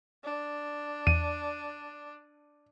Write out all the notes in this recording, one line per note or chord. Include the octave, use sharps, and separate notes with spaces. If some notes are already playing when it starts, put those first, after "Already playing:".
D4
E2 D#7